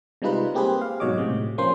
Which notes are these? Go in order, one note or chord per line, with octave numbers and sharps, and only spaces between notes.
C3 G3 G#3 D#4 F4 B4
A#3 C4 G4 G#4 B4 C5
F5
G#2 B2 F#3 C#5 D#5 D6
A2 C3 G#3
F3 A#3 C#4 C5 C6